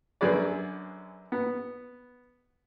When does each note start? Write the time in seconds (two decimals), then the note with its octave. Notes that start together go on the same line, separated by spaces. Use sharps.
0.21 F#2 D3 G#4 B4 D5
1.32 B3